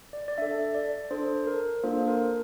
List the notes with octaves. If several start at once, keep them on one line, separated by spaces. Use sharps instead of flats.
D5
D5
D4 A4 E5
D5
D4 A4 C5
A#4
A#3 D4 F4 A4 C5
A#4